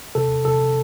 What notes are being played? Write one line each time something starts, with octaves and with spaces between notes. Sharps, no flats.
C3 A4
C3 A4